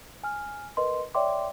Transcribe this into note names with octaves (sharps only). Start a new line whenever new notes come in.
G#5 F6
A#4 B4 D#5 C6
C#5 D5 E5 G5 C6 D6